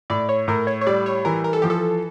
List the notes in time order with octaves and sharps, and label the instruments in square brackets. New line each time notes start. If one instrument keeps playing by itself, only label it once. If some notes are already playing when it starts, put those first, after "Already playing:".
[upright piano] A2 [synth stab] D5
[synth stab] C#5
[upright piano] A2 [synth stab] A#4
[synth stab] C#5
C#5
[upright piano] G3 [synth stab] D5
[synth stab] C#5
[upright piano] E3 [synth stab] A#4
[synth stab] A#4
A4
[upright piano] F3 [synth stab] G4
[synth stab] A4